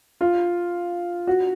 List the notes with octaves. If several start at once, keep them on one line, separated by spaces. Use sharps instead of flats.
F4
F#4